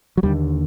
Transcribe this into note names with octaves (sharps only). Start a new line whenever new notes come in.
F#3
D#2 D3 G3